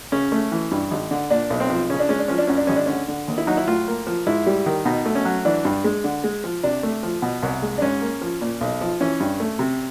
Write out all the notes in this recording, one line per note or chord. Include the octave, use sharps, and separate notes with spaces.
C#3 C#4
A3
E3
G2
G#1
D3
A#2 D4
B1
C4
F3
C#3 C#4
D4
G#3 C#4
D4
F3 C#4
D4
F#2 C#4
D4
G#1 C#4
D4
D3 C#4
D3
D#2
E4
F#3 D#4
E4
A2 F4
A#3
F3
G#2 E4
G3
D#3
B2 D#4
A3
C#4
F#3
E3 D4
G2
G#3
D3
G#3
F3
C3 D4
A3
F3
B2
C2
G#3
D4
G#2 C#4
A#3
F3
A#2
B1
F3
E3 C#4
G2
A3
C3